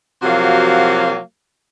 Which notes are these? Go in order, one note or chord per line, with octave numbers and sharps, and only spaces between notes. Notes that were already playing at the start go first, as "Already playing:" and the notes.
C3 F3 F#3 A#3 F#4